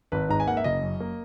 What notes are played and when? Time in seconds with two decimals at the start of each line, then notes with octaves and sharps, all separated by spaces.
0.12 G#1 B4
0.29 G#2 A#5
0.40 G#5
0.47 A#3 F#5
0.57 E5
0.64 F#1 D#5
0.83 F#2
1.00 A#3